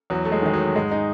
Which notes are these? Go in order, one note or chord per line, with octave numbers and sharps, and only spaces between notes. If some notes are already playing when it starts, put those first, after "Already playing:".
E2 F#3
A3
G#3
D#3 G#3
F#3
G#2 G#3
D#4